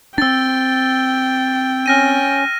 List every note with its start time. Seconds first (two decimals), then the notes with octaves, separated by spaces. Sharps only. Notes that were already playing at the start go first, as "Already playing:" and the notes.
0.18 C4 D4 G5 E6 A6
1.86 C#4 F6 A#6 D#7